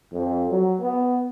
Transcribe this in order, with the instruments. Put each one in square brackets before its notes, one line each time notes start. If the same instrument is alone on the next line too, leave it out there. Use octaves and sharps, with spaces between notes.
[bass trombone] F2
F#3
B3